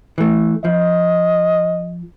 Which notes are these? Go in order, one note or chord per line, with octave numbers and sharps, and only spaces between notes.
E3 A3
F3 D#5